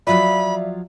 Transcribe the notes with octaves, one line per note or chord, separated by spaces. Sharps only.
F3 F#3 F4 D5 E5 B5